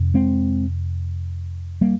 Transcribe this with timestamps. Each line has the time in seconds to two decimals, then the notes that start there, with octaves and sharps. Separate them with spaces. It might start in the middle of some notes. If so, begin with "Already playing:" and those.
Already playing: F2 C3
0.14 G#3 C4
1.81 G3 A#3